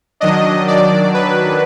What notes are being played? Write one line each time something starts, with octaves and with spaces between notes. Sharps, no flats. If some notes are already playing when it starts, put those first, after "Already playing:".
D#3 F#3 D4 D#5
D5
B4